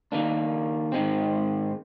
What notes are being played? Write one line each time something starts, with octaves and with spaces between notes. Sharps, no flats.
D#3 A#3 D4
G#2 D#3 G#3 C4